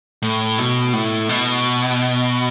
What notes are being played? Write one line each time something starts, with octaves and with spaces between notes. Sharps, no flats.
A2
B2
A2
B2